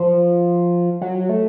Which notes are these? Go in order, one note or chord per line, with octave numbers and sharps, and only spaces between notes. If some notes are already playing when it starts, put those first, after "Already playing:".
Already playing: F3
F#3
A3